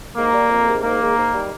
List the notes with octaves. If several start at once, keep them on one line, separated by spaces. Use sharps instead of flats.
G#2 A#3
G3
F2
C3 D#3 G#3
G#2 A#3
D#3 G#3
G#2
D#3 G3